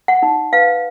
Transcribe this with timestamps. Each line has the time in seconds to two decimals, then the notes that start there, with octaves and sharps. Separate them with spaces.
0.08 F#5
0.22 D#4
0.53 B4 F5